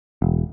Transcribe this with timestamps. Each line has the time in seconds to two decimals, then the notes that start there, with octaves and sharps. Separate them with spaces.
0.22 E1